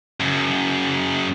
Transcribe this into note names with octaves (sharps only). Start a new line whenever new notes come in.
F#2 C#3